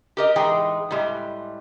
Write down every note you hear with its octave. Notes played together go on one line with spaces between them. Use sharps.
G4 A#4 D#5
A2 E3 G#3 D#4 G#4 G5
A2 G3 G#3